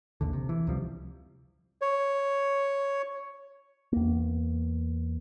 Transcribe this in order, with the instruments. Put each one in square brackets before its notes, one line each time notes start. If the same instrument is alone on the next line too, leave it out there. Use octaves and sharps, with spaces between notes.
[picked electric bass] A1 D#2 D3
C3
E3
C#2 C3 F3 G3
[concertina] C#5
[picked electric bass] E2 A#3